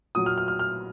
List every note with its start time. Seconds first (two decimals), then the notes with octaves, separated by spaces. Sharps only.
0.15 A#2 F#3 D#6
0.26 F6
0.38 F6
0.48 F6
0.59 F6